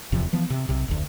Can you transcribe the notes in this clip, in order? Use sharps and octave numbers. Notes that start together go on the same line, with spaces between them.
D1 E2 C3 F3
E3 F3 B3
C3
B1 C3
F1 D2